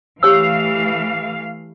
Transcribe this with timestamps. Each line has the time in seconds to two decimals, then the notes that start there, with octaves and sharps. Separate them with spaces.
0.23 E3 A3 G4 C#5 F5 E6